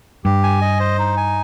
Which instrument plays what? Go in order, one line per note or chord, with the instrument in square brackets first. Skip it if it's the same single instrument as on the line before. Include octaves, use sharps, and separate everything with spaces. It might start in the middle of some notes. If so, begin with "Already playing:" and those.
[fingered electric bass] G2 [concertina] G4
[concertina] G#5
D#5
C5
D#4
G#5